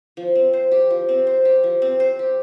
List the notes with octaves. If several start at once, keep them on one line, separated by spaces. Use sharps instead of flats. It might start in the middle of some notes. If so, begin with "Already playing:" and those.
F3
C4
C5
G4
F3
C4
C5
G4
F3
C4
C5
G4